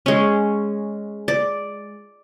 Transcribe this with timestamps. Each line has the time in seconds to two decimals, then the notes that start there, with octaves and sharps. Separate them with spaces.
0.06 G#3 C#4
1.28 D5